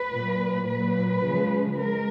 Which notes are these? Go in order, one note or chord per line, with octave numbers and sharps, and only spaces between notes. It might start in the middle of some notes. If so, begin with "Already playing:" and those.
Already playing: B4
A#2 F#3
A#2 F#3 B4
C#3 F3 G#3
G#3 A#4